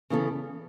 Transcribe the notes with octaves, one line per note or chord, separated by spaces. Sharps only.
C#3 E3 B3 A4